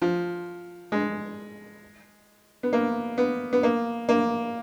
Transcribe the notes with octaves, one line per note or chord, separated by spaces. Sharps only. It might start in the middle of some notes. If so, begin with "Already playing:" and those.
F3
G#3
B3
A#3
B3
B3
A#3
A#3